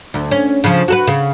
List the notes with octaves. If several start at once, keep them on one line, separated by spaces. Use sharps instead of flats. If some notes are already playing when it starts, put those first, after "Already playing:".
D2
C#4
C#3 F3
F#4 A4 B4
C#3